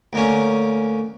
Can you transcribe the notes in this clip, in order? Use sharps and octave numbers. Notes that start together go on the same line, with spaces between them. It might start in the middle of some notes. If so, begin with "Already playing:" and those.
D2 A#3 C#4